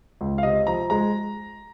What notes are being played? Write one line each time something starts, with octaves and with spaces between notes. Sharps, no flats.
C#2
F5
C3 D#5
F3 A#5
G#3 A#5